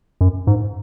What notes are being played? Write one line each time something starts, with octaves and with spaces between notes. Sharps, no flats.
F#2
G#2